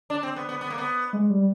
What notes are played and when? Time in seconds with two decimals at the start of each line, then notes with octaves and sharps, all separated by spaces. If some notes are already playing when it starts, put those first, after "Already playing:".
0.10 D4
0.23 C4
0.36 B3
0.49 B3
0.61 B3
0.70 A#3
0.78 B3
1.13 G#3
1.30 G3